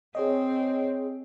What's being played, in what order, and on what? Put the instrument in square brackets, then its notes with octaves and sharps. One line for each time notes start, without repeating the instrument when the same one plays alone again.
[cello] C4 [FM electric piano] G#4 C#5 D#5